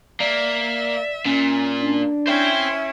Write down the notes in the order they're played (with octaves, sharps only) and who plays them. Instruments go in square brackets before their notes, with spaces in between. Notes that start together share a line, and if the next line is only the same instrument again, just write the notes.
[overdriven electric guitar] A#3 [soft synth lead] D5 [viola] E5
[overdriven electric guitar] A#2 [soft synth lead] C#4
[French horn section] D4
[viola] C#4 E4 [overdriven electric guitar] C5 G5 [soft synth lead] E5